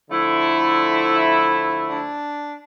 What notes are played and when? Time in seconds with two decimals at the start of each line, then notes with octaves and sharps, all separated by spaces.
0.10 D3 F3 A3 E4
1.90 D4